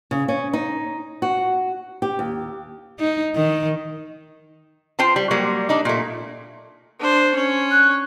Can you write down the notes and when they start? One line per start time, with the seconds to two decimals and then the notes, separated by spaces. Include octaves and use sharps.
0.11 C#3
0.28 C#4
0.53 D#4
1.22 F#4
2.02 G4
2.19 D#2
3.00 D#4
3.36 D#3
4.99 F4 C5 G5 A5
5.16 G3
5.31 F#3 G3 A#3
5.69 D4 D#4
5.85 A#2 A3
7.00 D4 C5
7.35 C#4 C#5
7.71 F#6